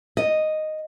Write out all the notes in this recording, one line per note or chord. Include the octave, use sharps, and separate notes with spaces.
D#5